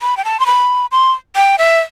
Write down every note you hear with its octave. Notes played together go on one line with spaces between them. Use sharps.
B5
G5
A5
C6
B5
C6
G5
E5